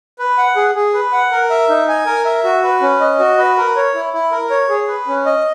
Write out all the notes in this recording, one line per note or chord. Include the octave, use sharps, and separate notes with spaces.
B4
F#5
G#4
G#4
B4
F#5
A#4
E5
D#4
G#5
A#4
E5
F#4
B4
C#4
D#5
F#4
B4
A#4
C#5
E4
E4
A#4
C#5
G#4
B4
C#4
D#5